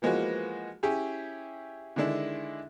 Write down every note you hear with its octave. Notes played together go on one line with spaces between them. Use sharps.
E3 F3 G#3 A#3 B3 F#4
C#4 E4 G4 G#4
D3 D#3 G#3 D4 E4